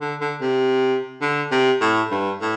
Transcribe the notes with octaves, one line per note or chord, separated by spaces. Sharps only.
D3
D3
C3
D3
C3
A2
G2
A2